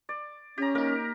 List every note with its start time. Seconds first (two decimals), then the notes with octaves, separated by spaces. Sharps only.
0.09 D5
0.58 C#4 G4 A#5
0.75 A#3 D#4 A#4